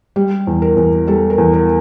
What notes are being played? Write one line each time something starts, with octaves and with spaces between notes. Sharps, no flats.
G3
E2
A#4
E2
G3 A4
A#4
E2
A#4